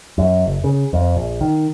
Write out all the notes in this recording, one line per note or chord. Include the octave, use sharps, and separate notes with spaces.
F#2
F#1
C#3
F2
A#1
D#3